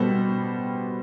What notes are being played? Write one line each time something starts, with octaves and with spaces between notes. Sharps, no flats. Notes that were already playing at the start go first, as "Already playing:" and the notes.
Already playing: B2 G3 B3 A4 C5